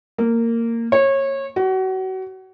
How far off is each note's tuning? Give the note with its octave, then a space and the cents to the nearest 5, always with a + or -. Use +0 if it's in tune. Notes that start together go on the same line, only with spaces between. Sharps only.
A#3 -15
C#5 -25
F#4 +30